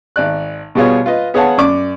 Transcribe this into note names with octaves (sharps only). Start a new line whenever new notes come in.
G#1 D5 F#6
B2 G3 B3 F4 G#4 C#5
F4 B4 D#5
B3 G#4 C#5 F5 F#5 A5
F#2 D5 D6